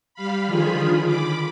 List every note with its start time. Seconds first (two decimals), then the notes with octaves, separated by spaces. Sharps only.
0.14 G3 F5 B5
0.47 D3 D#3 F3 F4 G#4 B5
1.04 B5 D6